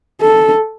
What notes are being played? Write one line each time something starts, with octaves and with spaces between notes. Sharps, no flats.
A4